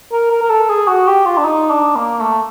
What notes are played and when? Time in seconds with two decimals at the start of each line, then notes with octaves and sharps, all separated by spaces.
0.12 A#4
0.31 A#4
0.42 A#4
0.50 A4
0.69 G#4
0.88 F#4
1.07 G4
1.26 F4
1.38 D4
1.45 D#4
1.70 D4
1.95 A#3
2.20 A3